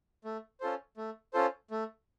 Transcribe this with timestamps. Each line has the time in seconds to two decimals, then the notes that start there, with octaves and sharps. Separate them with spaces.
0.24 A3
0.61 C#4 F4 A4 C5
0.97 A3
1.33 C#4 F4 A4 C5
1.71 A3